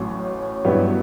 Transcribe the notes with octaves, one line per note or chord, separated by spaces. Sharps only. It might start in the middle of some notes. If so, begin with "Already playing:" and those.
Already playing: A1 A2 F#3
G2 F#3 B3 E4 G4